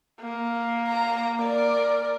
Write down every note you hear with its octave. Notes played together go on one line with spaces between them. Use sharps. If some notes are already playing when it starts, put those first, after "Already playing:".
A#3
A#5
A#4 D5